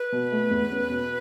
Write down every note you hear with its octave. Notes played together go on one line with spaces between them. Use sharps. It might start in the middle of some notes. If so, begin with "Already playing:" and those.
Already playing: B4
B2
A3
E2
C#4
B2